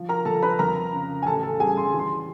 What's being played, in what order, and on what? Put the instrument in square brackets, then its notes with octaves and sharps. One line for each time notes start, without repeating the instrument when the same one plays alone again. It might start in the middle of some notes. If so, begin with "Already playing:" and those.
Already playing: [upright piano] F3
A#4 A#5
F3 A4 A5
B4 B5
F2 A#4 A#5
C#3
G#5
A1 A4 A5
A4 A5
G3 G#4 G#5
C6
E3
C6